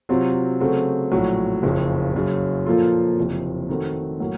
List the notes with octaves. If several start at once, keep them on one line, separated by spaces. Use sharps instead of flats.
C3 F#3 C4 F4
C#3 F#3 A3 C4
A#1 A2 F#3
F#1 F2 C#3
F#1 F#2 C#3
A#2 F3 A#3 F4 A4
F#1 F2 C3
D#3 A3 C4 F#4
A2 F#3 A#3